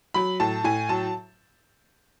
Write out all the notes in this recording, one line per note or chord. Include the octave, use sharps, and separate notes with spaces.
F#3 B5
A2 A5
A2 G#5
F#3 A5